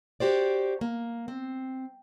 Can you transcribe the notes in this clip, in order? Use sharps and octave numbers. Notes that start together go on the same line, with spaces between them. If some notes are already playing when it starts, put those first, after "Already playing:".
F#4 G4 C5 D5
A#3
C4